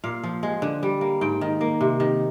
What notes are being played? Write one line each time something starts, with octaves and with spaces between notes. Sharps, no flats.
A#2 F5
F3
G#3
D3
G3
A#3
G#2 G5
D#3
A#3
C3
D#3